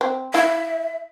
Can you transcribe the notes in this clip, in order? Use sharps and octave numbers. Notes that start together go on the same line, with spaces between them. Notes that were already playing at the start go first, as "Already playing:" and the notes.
C4
E4 E5 F5